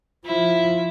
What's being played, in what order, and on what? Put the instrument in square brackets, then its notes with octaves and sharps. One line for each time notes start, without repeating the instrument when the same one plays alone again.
[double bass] F3 [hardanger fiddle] E4